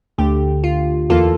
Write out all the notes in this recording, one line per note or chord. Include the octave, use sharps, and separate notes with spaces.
D2 D3 A3 G4
F4
E2 E3 A#3 F4 A4